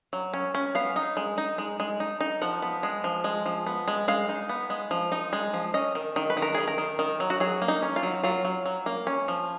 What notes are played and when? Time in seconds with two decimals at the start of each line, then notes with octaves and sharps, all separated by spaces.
0.13 F#3
0.34 C#4
0.55 C#4
0.75 B3 F5
0.96 D#4
1.17 G#3
1.38 D#4
1.58 G#3
1.80 G#3
2.00 D#4
2.21 D#4
2.42 F3 F#5
2.62 B3
2.83 G#3
3.04 F3
3.24 G#3
3.46 F3
3.66 B3
3.88 G#3
4.08 G#3 F5
4.29 D#4
4.49 B3
4.70 G#3
4.91 F3
5.12 D#4
5.33 G#3
5.54 F3
5.74 C#4 D#5
5.95 D#3
6.16 D#3
6.30 B4
6.37 D#3
6.42 A#4
6.55 D#3 G#4
6.68 A#4
6.78 D#3
6.99 D#3
7.20 F#3
7.30 F#4
7.40 F#3 G#4
7.62 A#3
7.68 D#4
7.82 C#4
7.96 F4
8.03 F#3
8.23 F#3 F4
8.45 F#3
8.66 F#3
8.86 A#3
9.07 C#4
9.28 F3